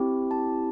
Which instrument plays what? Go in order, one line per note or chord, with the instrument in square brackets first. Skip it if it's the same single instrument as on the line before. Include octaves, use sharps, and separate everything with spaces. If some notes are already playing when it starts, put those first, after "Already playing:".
Already playing: [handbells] C4 E4 G4
A5